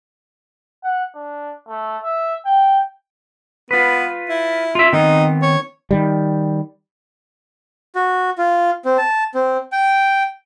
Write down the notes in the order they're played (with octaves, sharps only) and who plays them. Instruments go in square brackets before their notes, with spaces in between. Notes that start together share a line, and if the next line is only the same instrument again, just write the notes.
[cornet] F#5
D4
A3
E5
G5
[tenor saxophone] B3 [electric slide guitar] F4 B4
[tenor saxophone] E4
[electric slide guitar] F4 E5
[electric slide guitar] D#3 B3 C4 [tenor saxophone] D#4
[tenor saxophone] C#5
[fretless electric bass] D#3 G3
[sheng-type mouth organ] F#4
F4
C4
A5
C4
G5